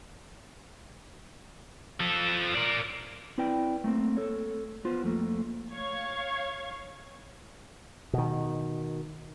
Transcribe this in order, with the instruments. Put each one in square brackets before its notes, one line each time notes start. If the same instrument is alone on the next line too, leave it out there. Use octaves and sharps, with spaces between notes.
[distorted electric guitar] F3 A4
A#4 D5
[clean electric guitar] C4 E4 B4 D5 G5
A3 A#3 C4
A4 C#5
B3 F4 C5
F2 A3 A#3
[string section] C#5 F5 C#6 G#6
[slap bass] B2 D#3